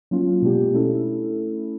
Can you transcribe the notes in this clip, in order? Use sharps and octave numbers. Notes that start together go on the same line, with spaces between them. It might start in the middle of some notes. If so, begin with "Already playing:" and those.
F#3 A#3 C#4 F4
B2 G#3 B3 D4 G4
A3 C#4 E4 A4